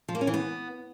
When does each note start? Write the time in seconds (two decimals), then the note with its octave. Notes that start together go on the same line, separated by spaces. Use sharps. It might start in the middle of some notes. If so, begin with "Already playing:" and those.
0.08 F3
0.15 A#3
0.21 C#4
0.27 E3
0.34 B3